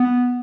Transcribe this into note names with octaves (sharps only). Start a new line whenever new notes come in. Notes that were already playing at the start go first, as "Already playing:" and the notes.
Already playing: B3